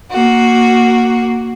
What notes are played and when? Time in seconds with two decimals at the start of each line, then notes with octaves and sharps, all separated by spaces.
0.11 A#3 F#4